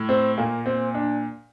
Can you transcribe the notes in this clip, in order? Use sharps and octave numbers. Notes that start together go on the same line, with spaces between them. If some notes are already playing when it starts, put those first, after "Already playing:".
Already playing: A2
C4
A#2 A#3
C4
D4